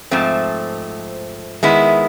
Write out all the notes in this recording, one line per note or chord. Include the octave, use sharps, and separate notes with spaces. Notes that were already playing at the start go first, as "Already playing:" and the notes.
G#2 F3 A3 C4
D#3 G#3 B3 E4